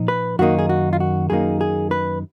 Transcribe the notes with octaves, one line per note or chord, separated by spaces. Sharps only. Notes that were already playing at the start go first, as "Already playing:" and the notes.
Already playing: A#2 F3 D#4
B4
F#2 D#3 A#3 D#4 F#4
G#4
F#4
F4
F#4
F#2 D#3 A#3 D#4 G#4
G#4
B4